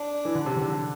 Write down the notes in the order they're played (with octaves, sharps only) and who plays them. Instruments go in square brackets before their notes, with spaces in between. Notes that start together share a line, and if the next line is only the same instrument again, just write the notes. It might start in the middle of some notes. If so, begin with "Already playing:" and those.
Already playing: [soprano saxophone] D4
[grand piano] E3
D3
C3
D3
D3